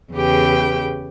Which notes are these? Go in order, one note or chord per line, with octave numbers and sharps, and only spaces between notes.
E2 C#3 G4 B4 G5